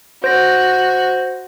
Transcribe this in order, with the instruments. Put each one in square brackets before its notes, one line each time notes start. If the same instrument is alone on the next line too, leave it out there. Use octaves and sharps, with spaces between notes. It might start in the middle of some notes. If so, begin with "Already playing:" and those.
[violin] F#4 [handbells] C5 A#6